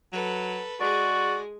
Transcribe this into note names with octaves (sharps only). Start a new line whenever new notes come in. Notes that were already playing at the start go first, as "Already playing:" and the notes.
F#3 A4 B4
G#3 F#4 G#4 D5